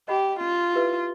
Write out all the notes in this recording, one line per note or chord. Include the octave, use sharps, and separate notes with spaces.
G4 D#5 F#5 B5
C#4 F4
E4 G4 B4 E5